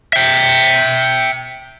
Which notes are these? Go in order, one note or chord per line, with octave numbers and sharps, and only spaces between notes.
E5 G5